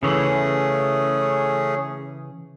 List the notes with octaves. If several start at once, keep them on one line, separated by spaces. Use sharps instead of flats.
C#3 E3 A3 C#4 G#4